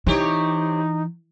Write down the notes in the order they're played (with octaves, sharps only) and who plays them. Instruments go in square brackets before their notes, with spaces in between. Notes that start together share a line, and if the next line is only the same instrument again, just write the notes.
[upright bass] E3 [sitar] C4 G4 C#5 [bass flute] D#4